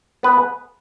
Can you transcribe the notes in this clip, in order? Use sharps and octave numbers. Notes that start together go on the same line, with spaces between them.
B3 B4